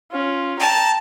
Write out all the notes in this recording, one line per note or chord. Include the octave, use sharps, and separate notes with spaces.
C#4 F4
G5 A5 A#5